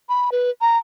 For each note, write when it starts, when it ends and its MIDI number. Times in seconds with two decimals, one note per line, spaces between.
0.09 0.30 83
0.32 0.50 71
0.61 0.78 82